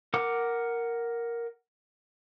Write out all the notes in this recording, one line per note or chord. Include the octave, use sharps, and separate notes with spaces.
A#4 F#5 D6